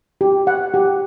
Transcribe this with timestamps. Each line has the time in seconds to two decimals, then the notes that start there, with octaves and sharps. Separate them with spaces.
0.21 G4
0.47 F#5
0.74 G4